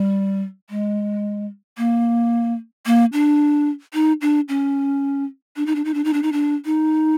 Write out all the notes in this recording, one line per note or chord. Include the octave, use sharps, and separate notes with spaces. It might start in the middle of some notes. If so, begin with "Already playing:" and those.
Already playing: G3
G#3
A#3
A#3
D4
D#4
D4
C#4
D4
D#4
D4
D#4
D4
D#4
D4
D#4
D4
D#4